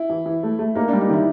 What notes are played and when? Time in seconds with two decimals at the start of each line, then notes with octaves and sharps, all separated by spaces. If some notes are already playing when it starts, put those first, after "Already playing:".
Already playing: E4
0.10 E3
0.26 E3
0.43 A3
0.59 A3
0.75 A#3 D#4
0.88 D4
0.93 G3
1.01 D#4
1.09 D#3 E4